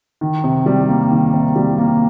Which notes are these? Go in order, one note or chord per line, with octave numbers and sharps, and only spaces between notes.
D#3
C3
G3
A#3
D#3
C3
G3
A#3